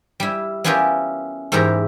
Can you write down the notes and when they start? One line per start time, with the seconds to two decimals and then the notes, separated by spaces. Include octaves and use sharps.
0.20 G3 E4
0.64 B3 C#4 E4 F4 G4 A#4
1.52 E2 G#2 E4 G4 A#4 A#5